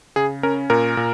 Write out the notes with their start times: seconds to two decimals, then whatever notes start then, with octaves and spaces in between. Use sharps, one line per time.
0.16 C#3 G#4
0.43 C#4 A#4
0.70 A#2 A#4
0.97 A#2